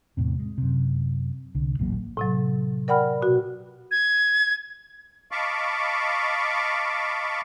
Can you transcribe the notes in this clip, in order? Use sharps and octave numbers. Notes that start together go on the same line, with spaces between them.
E2 A2 C3
G#3
F#2 C3
C2 D3
D#1 A1 F#3 A#3
A2 C3 F#3
A#4 D5 F#5 G5 B5 F6
B2 F#4
G#6
D#5 F5 A5 B5 C#6 D6